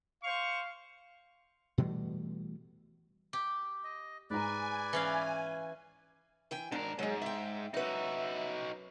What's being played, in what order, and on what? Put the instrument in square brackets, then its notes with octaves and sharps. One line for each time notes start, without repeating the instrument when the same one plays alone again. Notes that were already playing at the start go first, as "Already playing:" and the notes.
[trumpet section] C5 C#6 [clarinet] F5
[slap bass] B2 E3 G3 A3
[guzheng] G4
[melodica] D#5
[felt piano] G#2 A#5 [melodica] B4 D5 [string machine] G#5
[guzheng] E3 C#4 F5
[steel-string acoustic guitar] E3 G5 G#5
[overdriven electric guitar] G#2 A#4 [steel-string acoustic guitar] D4
[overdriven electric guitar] G#2 [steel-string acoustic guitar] F#3 G#3
[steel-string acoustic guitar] E5 G5
[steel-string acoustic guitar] F#2 B4 [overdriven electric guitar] D#4 F#4 [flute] E5